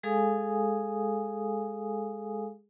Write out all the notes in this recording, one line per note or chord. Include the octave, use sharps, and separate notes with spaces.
G#3 G#4 A4 F5 G#5 D#6